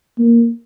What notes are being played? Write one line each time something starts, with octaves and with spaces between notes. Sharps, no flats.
A#3